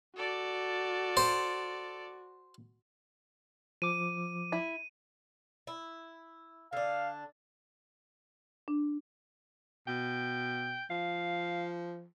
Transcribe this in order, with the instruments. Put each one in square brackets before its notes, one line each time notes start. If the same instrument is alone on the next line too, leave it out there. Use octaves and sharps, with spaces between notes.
[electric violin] F#4 [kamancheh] A4 D5
[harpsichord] C5
[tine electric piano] F3 D6 [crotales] D#7
[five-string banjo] E4
[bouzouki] E4
[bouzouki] D3 D4 [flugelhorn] F5
[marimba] D4
[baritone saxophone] B2 [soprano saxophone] G5
[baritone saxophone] F3 [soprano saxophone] F5